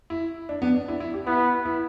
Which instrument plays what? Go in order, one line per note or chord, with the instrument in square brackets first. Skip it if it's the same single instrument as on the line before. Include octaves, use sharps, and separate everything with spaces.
[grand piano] E4
D4
B3
D4
E4
E4
G4
[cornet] B3 [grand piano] E4
[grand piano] E4